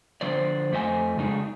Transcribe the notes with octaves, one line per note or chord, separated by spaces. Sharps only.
D3 F3 C5 D5
F2 A3 C5 D#5 G#5
C#3 G#3 D4 D#4 G#4